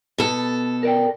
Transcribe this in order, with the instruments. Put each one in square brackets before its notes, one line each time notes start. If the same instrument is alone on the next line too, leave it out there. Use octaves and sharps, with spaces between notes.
[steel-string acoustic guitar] B2 A4
[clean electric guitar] A#4 D5 G5